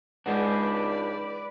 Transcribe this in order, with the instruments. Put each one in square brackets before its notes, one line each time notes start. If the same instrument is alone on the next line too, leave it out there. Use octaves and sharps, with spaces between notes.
[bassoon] C#2 [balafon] G#3 F#5 [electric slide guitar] D4 D#4 G#4 [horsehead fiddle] B4 D5